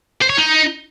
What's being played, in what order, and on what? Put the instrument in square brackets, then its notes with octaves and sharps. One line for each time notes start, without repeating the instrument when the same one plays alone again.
[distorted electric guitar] C5
C#5
D#4